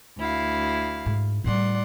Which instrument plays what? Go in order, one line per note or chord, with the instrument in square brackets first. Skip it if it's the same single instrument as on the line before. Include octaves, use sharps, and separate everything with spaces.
[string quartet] D2 E4 F5
[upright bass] G#2
[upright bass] A2 G3 [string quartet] D5 F#5 C6